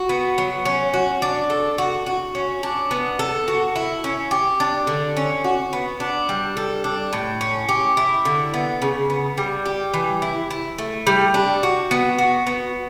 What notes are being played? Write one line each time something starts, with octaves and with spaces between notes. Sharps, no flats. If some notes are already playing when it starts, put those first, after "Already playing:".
Already playing: F#4
B3
F#3
C#4
F#4
D4
A4
F#4
F#4
C#4
D4
B3
A4
F#4
E4
C#4
G4
D4
D3
C#4
F#4
B3
D4
G3
A4
D4
A2
C#4
G4
E4
D3
B3
C#3
B3
G3
G4
E3
E4
E4
A3
G3
D4
F#4
B3
F#4
B3